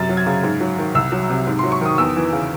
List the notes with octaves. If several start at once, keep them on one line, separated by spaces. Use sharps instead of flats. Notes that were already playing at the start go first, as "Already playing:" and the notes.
Already playing: F#2 C3 A6
F#3
G#6
C#3
G#2
F#3
D#3
C2 E6
F#3
C3
G#2
F#3 C6
C#6
D#3 D#6
E2 E6
E3
C#3